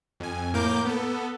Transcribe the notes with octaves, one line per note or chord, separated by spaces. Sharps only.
F2 G#5
A2 A#3 A#4 D6 G6
B3 A4